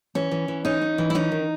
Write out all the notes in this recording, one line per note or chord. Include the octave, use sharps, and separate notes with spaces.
E3 C#4
E3
E3
C#4 D#4
C#4
E3
E4
C#4 D#4
D#3